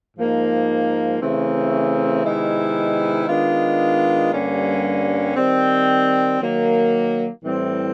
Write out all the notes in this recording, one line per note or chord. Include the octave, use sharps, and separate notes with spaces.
G#2 F3 A#3 D#4
C#3 E3 A3 C4
C3 D#3 G#3 B3 E4
D#3 G#3 B3 D4 F4
G2 D3 G3 A#3 C#4
D#3 G3 C4
D#3 F#3 A#3
A2 E3 G3 C4